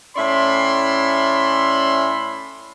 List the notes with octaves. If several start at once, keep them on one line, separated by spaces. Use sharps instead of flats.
A2 C#4 D5 E5 B5 C6